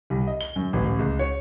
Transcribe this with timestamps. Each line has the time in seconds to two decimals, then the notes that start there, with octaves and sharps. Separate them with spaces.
0.10 C2
0.27 D#5
0.41 G7
0.56 F#2
0.73 A1
0.85 A1
0.99 C#2
1.19 C#5